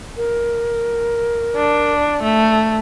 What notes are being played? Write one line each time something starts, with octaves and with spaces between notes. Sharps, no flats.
A#4
D4
A3